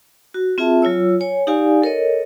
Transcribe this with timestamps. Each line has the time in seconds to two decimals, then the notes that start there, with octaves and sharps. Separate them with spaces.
0.34 F#4
0.58 C4 F4 G#4 E5 A5
0.82 F#3 F4 C#5 E6
1.20 C#5 G#5
1.47 D#4 G4 D5 F5 G#5
1.82 A4 A#4 C#5 D#5